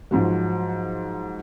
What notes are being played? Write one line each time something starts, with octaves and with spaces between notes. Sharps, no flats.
G#2 F3 F#3